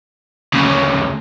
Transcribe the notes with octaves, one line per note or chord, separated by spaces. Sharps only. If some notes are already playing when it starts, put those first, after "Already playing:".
D2 C#3